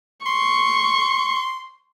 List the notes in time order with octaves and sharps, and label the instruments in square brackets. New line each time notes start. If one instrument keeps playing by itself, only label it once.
[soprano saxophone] C6 [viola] C#6